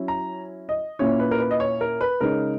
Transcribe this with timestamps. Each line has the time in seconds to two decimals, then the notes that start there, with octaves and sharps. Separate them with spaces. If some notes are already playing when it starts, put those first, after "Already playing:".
Already playing: F#3 C#4 E4
0.08 A#5
0.69 D#5
0.99 A#2 A#3 C#4 E4 C#5
1.20 B4
1.31 A#4
1.39 B4
1.51 D#5
1.60 C#5
1.81 A#4
2.01 B4
2.21 C#3 G#3 D#4 A#4